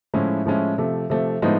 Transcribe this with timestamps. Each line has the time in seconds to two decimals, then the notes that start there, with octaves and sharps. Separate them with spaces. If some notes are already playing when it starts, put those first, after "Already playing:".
0.14 A2 F3 G#3 C#4 E4
0.46 A2 F3 G#3 C#4 E4
0.78 C3 F3 A3
1.10 C3 F3 A3
1.42 A2 F3 G#3 B3 D#4